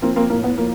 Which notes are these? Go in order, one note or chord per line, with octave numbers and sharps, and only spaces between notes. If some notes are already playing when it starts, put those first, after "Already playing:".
F3 A#3 C4
A#3 C4
A2 A#3
B3
F3 A#3